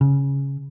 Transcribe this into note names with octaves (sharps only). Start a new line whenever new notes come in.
C#3